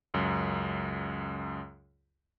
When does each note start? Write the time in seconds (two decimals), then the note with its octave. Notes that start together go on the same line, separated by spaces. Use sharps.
0.14 C#2 F#2